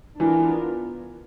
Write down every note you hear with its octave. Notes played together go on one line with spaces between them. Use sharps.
E3 B3 D4 F4 A#4